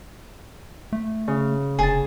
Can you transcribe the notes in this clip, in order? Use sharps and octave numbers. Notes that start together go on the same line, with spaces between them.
A3
C#3
F1 G#4 A5